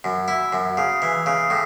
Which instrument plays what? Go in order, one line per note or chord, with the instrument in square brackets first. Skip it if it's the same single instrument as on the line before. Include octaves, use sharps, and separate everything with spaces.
[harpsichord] F#2
E4
F#2
C#3
E3
C#3
A2